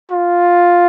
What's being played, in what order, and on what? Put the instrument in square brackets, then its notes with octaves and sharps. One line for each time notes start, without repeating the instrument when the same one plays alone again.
[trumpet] F4